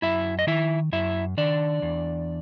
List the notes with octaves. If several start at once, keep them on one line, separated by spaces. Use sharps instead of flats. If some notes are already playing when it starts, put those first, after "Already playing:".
F#2 E4 E5
D#5
D#3 E4 E5
F#2 E4 E5
D#3 D4 D5
E2